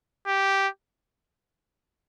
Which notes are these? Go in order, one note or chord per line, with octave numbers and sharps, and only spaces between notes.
G4